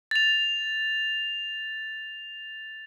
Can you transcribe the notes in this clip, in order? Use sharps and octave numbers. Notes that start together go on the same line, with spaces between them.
A6 F7